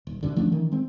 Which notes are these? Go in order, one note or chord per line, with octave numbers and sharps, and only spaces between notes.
D#1
C#2 F#2 B2 D3
F3 A3 C#4 D4
D#3 E3
G#3 C4